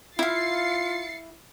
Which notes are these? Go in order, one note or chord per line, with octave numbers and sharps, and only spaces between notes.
E4 F4 F5 A6 C7 C#7